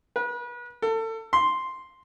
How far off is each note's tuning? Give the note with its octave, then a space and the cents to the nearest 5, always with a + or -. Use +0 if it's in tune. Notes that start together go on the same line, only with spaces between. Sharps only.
B4 -35
A4 +30
C6 +0